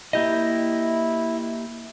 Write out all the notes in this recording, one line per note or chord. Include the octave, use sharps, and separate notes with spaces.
A#3 E4 G4 D#5